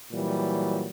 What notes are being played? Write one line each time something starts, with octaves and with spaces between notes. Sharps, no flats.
A#2 E3 F#3 G3